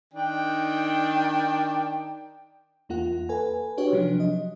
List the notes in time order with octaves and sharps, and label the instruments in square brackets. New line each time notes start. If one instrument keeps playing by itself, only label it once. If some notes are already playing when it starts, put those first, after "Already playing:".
[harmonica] D#3 D4 G5
[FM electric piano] E2 A#3 F4 F#5
A4 B4 G#5
D4 F#4 G4 B4 C#5
C3 F3 F#3 D4
D#5